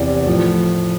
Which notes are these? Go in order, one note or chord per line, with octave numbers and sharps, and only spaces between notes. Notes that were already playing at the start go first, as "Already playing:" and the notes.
Already playing: E2 C3 E3 D5
A2 F3